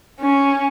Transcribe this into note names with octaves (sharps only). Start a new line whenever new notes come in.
C#4